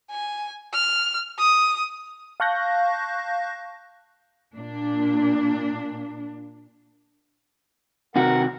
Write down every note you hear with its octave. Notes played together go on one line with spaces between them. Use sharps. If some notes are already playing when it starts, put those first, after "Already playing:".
G#5
F6
D#6
F5 A5 C#6 F#6 G6 A#6
A#2 D4
C3 D#3 F#4 A#4 F#5